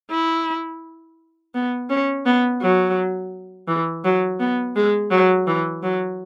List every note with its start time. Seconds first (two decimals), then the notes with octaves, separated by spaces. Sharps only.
0.11 E4
1.55 B3
1.90 C#4
2.26 B3
2.62 F#3
3.68 E3
4.05 F#3
4.40 B3
4.76 G#3
5.11 F#3
5.47 E3
5.83 F#3